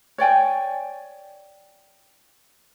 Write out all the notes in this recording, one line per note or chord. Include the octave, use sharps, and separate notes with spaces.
C#5 D5 G5 G#5